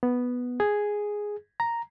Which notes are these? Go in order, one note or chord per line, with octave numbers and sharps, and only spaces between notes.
B3
G#4
A#5